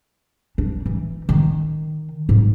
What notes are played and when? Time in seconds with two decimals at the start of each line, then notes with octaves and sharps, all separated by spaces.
0.58 D4
0.86 E3
1.29 D#3
2.29 G#2